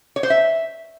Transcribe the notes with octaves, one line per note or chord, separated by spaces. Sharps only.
C#5
C5
E5